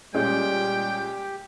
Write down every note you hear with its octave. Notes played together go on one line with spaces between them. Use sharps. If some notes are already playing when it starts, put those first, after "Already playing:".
A#2 G3 G#3 C#4 G4 G5